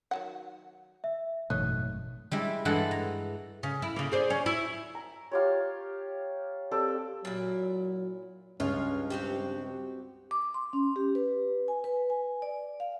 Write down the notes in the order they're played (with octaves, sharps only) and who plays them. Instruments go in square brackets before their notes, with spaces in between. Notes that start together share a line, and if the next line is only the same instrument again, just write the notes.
[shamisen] D#3 F#3 F#5
[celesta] E5
[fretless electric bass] G#1 F#2 A3 [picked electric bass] B2 E3 [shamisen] D#4 C#5 [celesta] F#6
[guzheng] G3 G#3 E4
G2 E3 G#3 A4 F#5
A#5
[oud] C#3
E4
C#3 A#3
G#4 C5 D5
C#4
E4
[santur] A#5
F4 G4 C#5
C4 G4 A4 D5
[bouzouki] A#2 E4 [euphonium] F#3
[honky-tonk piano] C#2 [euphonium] G2 [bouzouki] F4 C#5
[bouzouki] C4 F#4 G4
[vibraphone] D6
C6
C#4
G4
B4
G#5
B4
G#5
D5
F5